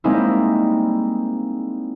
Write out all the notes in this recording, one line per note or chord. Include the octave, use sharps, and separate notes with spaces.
G3 G#3 A#3 C4 D#4 E4